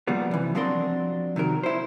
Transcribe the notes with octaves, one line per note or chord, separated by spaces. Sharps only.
C#3 F3 G3 A#3 B3
C3 E3
F3 F#3 C4 D4 A#4 C6
C3 D#3 F#3 A#4
E4 C5